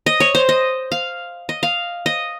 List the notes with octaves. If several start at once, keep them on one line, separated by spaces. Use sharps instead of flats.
D#5
C#5
C5
D#5
F5
D#5
F5
D#5